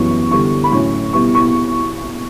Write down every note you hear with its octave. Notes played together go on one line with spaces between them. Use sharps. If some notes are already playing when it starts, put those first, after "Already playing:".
Already playing: F#2 E3 G3 B3 C#6
D3 G3 B3 E4 C#6
B5
A2 F#3 C#4 E4 C#6
B2 G3 B3 E4 C#6
C#6